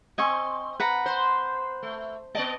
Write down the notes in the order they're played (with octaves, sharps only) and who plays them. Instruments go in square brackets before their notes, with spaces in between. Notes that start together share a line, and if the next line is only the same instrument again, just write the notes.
[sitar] C4 [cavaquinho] D#5 G#5 C#6
[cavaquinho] B4 F#5 A#5
[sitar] C5
A3
[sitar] B3 D5 D#5 [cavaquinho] A5